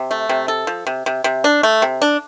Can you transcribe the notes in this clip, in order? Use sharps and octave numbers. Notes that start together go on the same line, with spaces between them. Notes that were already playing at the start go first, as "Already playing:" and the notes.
Already playing: C3
A3
C3
A4
F3
C3
C3
C3
D4
A3
C3
D4